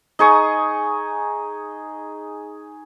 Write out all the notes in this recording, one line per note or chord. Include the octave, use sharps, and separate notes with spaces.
D#4 G#4 C#6 D#6